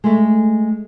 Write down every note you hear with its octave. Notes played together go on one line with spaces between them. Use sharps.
G#3 A3